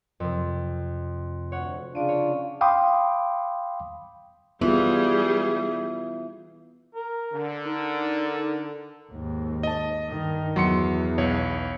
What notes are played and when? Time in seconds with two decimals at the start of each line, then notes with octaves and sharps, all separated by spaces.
0.20 F2 C3
1.52 D2 C#5 F#5
1.95 C#3 D4 F4 D7 D#7
2.09 C#5
2.61 F5 G5 B5 C6 D6 D#6
4.61 E3 G3 B3 F4 G#4
6.95 A#4
7.33 D3
7.65 D#4 A#4
9.12 D#2 G#2
9.63 D#5 A5
10.06 G2 D#3
10.56 E2 F#3 C6 C#7
11.18 B1 C#5